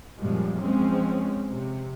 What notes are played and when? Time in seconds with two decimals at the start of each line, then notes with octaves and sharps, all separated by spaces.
0.20 F#2 A#2 F3 G3 G#3
0.61 F3 G#3 C4 C#4
1.51 C3